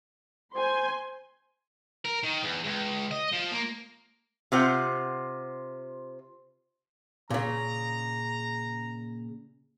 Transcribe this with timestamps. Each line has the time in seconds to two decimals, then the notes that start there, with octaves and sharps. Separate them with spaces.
0.55 C5 G#5 C6
2.05 A#4
2.24 D#3
2.44 E2
2.65 C#2
3.11 D#5
3.33 F3
3.51 A#3
4.52 C3 F4 C5 F#5
7.30 A#2 C#3 A#5